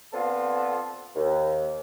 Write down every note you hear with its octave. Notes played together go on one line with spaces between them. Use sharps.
D3 B3 C4 F4 A4
D#2